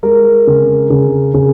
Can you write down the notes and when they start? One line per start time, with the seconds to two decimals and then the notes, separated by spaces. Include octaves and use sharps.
0.03 G#3 A#4
0.47 C#3
0.90 C#3
1.34 C#3